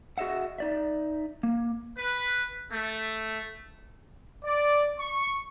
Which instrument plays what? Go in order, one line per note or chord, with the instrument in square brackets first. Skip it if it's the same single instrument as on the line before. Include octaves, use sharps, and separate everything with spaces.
[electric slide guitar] F#4 G#4 D#5 E5 F#5
D#4 D5 E5
A#3
[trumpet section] B4
A3
D5
C#6